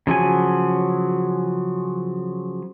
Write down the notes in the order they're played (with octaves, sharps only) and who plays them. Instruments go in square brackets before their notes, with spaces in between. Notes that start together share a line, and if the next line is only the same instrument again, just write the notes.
[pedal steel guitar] C#3 F3 F#3 G#5